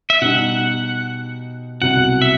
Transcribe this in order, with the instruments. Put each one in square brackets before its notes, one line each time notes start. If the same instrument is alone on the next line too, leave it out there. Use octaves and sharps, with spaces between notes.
[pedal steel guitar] E5
[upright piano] B2 G3 D#4 [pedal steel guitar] F#5
[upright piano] C2 B2 F#3 [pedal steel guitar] F#5
[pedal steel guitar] E5